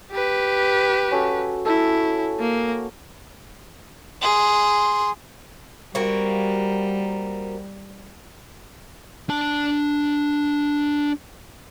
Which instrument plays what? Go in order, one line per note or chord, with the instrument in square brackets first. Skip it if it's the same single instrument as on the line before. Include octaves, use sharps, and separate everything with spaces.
[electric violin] G4 B4
[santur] C#4 F#4 A4
[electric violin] E4 [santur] A4
[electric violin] A#3
[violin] G#4 [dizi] C6
[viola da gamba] G3 [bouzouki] A#3 C4 F#4
[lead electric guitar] D4 A5